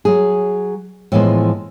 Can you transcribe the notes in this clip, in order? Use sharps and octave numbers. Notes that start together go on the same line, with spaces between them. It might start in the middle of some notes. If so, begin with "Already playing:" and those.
F#3 G#4
A2 E3 F3 G#3 B3 C5